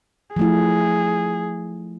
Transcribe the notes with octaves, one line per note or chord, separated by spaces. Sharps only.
F3 A3 E4 G#4